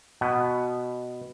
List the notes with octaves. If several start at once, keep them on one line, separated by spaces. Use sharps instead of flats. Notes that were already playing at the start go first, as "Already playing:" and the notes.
B2 B3